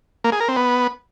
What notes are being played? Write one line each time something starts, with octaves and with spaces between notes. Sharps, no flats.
A#3
G#4
A#4
C4
B3